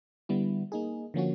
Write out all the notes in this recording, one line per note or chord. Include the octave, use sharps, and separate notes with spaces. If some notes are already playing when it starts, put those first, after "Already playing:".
D3 G3 B3 E4
A#3 D#4 G#4
D3 F3 A#3 C#4 F#4